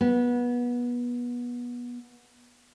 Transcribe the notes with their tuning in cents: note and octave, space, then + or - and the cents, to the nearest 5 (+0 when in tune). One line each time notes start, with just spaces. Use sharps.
B3 -25